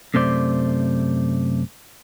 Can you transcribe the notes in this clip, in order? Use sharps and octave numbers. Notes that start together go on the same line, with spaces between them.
F#2 C3 A3 C5 D5